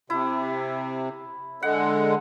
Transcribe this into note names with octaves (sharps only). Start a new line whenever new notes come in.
C3 E4
D3 G#3 F#5